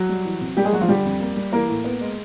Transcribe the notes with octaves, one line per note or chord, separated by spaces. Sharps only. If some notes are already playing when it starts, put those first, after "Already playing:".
Already playing: F#3 F#4
G3
E3
C3
G3 A#3 G4
G#3 G#4
F#3 G3 F#4
F3 F4
D3 G3 G4
F2
A#3
G3
E3 A#3 A#4
A2
B3
G#3